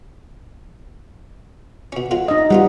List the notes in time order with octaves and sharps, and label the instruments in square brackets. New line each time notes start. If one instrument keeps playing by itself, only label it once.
[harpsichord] B2 C#4
F#3 G#3 F4
[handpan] D#4 D#5
[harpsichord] F#3 B3 F4 [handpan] G3